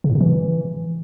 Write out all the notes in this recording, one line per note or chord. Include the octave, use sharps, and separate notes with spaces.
C#3
A2
C3
E3